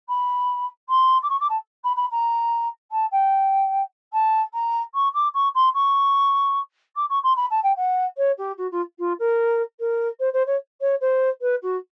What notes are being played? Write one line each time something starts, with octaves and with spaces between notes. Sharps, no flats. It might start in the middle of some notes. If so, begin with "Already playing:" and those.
B5
C6
D6
C#6
D6
A5
B5
B5
A#5
A5
G5
A5
A#5
C#6
D6
C#6
C6
C#6
D6
C#6
C6
B5
A5
G5
F#5
C#5
G4
F#4
F4
F4
A#4
A#4
C5
C5
C#5
C#5
C5
B4
F#4